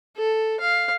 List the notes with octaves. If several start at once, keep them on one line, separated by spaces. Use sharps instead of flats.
A4
F5